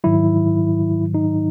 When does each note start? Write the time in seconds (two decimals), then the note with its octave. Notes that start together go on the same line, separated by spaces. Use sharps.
0.04 G#2 D#3 F#3 E4
1.15 D#4